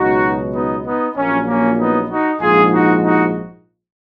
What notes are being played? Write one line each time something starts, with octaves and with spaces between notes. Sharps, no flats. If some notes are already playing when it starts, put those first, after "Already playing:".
Already playing: C#2 B2 F#3 D#4 F#4
B3 D#4
B3 D#4
A#1 A#2 F#3 A#3 C#4
A#3 C#4
B3 D#4
D#4 F#4
A#1 G#2 F3 F4 G#4
D#4 F#4
D#4 F#4